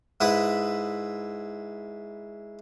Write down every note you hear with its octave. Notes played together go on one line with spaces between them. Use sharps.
G#2 E4 B4 D#6